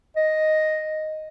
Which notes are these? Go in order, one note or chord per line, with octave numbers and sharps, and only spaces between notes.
D#5